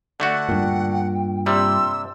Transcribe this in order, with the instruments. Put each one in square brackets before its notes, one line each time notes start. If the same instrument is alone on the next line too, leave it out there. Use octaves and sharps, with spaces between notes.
[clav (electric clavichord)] D3 A3 F#4 [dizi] F#5
[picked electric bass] G2 A#2 [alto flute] G5
[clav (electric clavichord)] C3 G3 [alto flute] C6 [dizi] E6